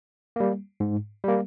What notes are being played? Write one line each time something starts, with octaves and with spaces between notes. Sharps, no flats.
G3 A#3
G#2
G3 A#3